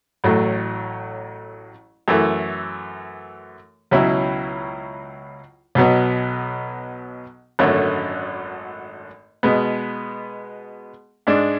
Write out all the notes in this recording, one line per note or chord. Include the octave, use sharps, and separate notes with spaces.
A1 A2 F#3 A3
F#2 E3 A3
C#2 B2 F#3 C#4 E4
B1 B2 F#3 B3
G#1 F#2 D3 A3 C#4
B2 G#3 B3
G#2 G#3 D4